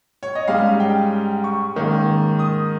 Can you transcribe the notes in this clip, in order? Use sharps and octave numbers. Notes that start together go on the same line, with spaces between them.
C#5
D#5
G#2 G3 C#4 F5
G5
C#6
G#2 D#3 A#3 C#4
D#6